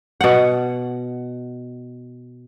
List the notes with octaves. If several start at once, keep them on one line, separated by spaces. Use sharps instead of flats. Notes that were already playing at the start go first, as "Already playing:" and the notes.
B2 F#5